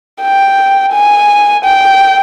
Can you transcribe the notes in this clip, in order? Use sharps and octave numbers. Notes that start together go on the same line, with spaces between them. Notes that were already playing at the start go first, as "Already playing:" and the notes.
G5
G#5
G5